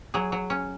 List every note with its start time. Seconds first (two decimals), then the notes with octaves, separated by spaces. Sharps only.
0.14 F#3 G#4
0.32 F#3
0.50 C#4